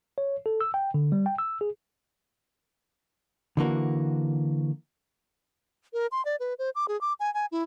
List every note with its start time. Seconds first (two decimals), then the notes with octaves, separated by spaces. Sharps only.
0.18 C#5
0.46 A4
0.61 E6
0.74 G5
0.94 D3
1.12 G3
1.26 G5
1.38 E6
1.61 G#4
3.57 D3 E3 A#3 F#4
5.93 A#4
6.12 C6
6.25 D5
6.40 B4
6.59 C5
6.75 D6
6.88 G#4
7.01 D6
7.20 G#5
7.34 G#5
7.52 E4